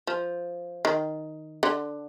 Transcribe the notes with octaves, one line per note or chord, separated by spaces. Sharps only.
F3
D#3
D3